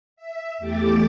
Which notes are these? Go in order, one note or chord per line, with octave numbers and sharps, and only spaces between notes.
E5
E2 A3 G4 D6 A6